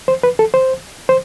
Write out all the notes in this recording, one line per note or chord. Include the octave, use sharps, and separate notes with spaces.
C5
B4
A4
C5
C5